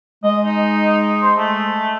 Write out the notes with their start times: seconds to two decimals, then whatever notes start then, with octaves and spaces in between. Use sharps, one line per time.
0.24 G#3 D#5
0.45 D#4
1.23 C5
1.38 A3